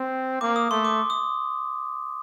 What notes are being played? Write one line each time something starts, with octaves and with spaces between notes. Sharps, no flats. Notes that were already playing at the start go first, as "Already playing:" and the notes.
Already playing: C4
A#3 D6
D#6
A3 C6
D6
D#6